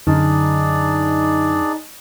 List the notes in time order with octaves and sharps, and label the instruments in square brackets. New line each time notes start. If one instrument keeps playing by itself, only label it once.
[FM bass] F#2 [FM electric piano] D3 [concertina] D4 G#4 D5 [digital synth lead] D#4